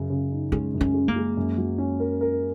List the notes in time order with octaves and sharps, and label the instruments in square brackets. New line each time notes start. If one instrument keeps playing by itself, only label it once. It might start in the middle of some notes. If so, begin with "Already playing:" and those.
Already playing: [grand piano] F#2 C#3
C#3
D#4
[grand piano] G#3 [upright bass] C#4
[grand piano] F#2
[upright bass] C#4
[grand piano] G#3
[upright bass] A#3
[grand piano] G#3
F#2
F#3
C#4
A#4
A#4